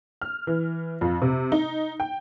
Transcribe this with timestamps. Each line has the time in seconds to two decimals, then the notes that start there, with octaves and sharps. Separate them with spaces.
0.22 F6
0.47 E3
1.01 F2
1.22 C3
1.52 D#4
2.00 G5